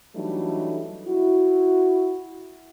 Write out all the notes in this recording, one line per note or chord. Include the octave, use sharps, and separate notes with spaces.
E3 F#3 G3 A3 D4 D#4
E4 F#4